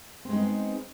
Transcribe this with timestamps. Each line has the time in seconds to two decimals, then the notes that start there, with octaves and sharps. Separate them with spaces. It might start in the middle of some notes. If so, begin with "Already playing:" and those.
0.25 C4
0.29 G#3
0.33 D#4
0.37 B3